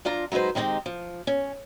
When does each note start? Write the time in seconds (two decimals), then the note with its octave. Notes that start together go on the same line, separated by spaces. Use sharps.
0.05 F3 D4 F4 A#5
0.32 F#3 G#3 D#4 B4 C5
0.55 D#3 G#3 C4 D#4 G4
0.86 F3
1.27 C#4